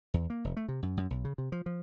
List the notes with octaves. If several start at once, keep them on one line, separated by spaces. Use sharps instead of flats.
E2
A#3
F1
A3
C3
F#2
F#2
B1
C#3
C3
F3
F3